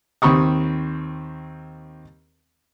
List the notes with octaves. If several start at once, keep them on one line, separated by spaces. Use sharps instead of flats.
D#2 C4 B5 C#6 D#6